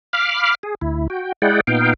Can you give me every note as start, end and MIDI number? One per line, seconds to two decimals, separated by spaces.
0.13 0.55 77
0.13 0.55 83
0.13 0.55 86
0.13 0.55 89
0.63 0.75 68
0.81 1.07 38
0.81 1.07 64
1.10 1.32 66
1.10 1.32 79
1.42 1.61 56
1.42 1.61 64
1.42 1.61 68
1.42 1.61 74
1.42 1.61 78
1.42 1.61 79
1.67 1.94 46
1.67 1.94 59
1.67 1.94 63
1.67 1.94 77
1.67 1.94 79